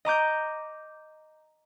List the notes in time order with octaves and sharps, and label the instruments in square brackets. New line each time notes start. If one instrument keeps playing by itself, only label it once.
[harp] D#5 A#5 D6 G6